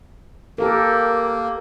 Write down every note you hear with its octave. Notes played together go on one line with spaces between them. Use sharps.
A#3 G4 A4 A#4